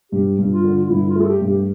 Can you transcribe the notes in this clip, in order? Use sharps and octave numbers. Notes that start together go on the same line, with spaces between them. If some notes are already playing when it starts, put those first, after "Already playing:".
G2 G4
G2
F4
D3
F4
G2 E4
F4
A3 A4
G4
G2
G4